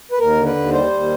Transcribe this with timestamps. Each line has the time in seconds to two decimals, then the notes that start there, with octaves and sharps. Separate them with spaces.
0.12 B4
0.19 D#2 A#4
0.37 D3
0.46 B4
0.55 D#2
0.72 G3 C5
0.91 D#2